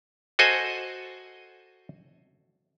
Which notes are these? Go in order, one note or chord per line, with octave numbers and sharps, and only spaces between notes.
F#4 A4 C5 D#5 G#5